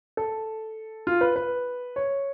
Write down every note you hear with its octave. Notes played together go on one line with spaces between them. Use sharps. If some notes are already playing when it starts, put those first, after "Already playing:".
A4
F4
B4
B4
C#5